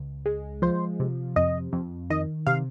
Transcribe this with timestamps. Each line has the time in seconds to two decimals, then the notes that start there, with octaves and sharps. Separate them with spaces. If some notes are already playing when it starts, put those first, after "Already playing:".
Already playing: C#2
0.26 G#3
0.62 F3 C5
1.00 C3
1.36 F2 D#5
1.73 F2
2.10 D#3 D#5
2.47 C3 F5